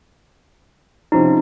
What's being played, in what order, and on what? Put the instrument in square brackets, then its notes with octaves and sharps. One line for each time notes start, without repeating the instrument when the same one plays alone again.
[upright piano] C3 F3 C#4 [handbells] D#4